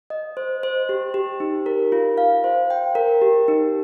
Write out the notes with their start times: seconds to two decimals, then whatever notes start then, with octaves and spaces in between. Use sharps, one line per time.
0.10 D#5
0.37 C5
0.63 C5
0.89 G4
1.14 G4
1.40 D#4
1.66 A#4
1.92 F4
2.18 F5
2.44 C5
2.70 G5
2.95 A#4
3.22 G4
3.48 D#4